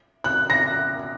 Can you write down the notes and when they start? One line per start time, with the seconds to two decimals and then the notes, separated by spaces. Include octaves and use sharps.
0.24 F#6
0.50 A#6